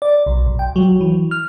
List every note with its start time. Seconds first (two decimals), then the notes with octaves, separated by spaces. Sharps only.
0.02 D5
0.26 B1
0.46 B1
0.59 G5
0.76 F#3
1.01 E3
1.31 F6